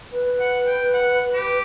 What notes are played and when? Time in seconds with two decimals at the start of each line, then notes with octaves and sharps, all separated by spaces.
0.12 B4
0.40 F#5
0.67 G5
0.94 F#5
1.34 G4